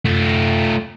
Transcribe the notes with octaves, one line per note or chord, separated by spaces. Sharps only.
A3 F4